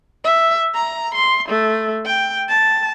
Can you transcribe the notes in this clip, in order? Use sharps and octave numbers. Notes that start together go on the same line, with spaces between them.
E5
A#5
C6
A3
G5
A5